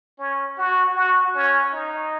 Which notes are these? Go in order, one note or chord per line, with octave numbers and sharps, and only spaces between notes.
C#4
F#4
F#4
C#4
D#4